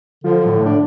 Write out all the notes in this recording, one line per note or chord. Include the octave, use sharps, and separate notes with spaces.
D3 F3
A2
D4